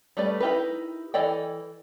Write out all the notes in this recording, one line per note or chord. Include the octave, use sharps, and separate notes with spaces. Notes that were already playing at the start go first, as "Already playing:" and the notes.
G3 A3 B4 D5
D#4 E4 G4 A#4 B4
E3 A4 D5 D#5 G5